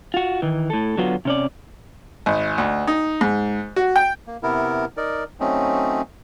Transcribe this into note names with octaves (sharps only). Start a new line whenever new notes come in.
F4 F#4
D#3 E3
A2 A4
D3 F#3 B3 F4 F#4
C3 C#4 D5
G#1
D2
D#4
G#2
F#4
G5
A#3
C3 B3 E4 A#4
D#4 A#4 D5
F#3 A3 C4 C#4 D#4